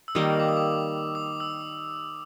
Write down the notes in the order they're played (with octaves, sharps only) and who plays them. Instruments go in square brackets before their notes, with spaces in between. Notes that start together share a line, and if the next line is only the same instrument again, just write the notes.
[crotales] E6
[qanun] D#3 G3 A#3 [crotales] D#6
[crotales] D6
D#6
D6
D#6
E6